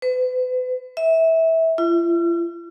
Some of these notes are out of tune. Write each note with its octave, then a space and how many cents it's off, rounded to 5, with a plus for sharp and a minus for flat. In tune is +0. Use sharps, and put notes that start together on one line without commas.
B4 +40
E5 -20
F4 -45